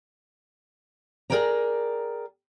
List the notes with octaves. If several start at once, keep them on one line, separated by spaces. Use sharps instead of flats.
G#4 A#4 C#5 D5 G5 A#5